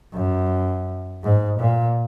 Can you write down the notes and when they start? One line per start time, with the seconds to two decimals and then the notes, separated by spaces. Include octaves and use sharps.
0.14 F#2
1.23 G#2
1.59 A#2